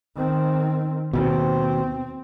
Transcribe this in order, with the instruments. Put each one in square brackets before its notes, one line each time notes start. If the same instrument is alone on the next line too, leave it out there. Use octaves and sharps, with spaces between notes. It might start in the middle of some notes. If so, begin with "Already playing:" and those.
[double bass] D#3 C4
[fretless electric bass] D#2 B2 [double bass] C4